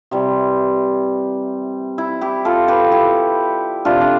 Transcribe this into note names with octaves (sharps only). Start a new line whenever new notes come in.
C3 E3 G3 C4
E4
E4 G4
F4 A4
G4 B4
E4 G4
C3 F3 A3 D4 F4
D4